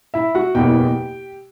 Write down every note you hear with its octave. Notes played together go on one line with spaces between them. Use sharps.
E4 E5
F#4 F#5
F#1 E2 B2 G4 G5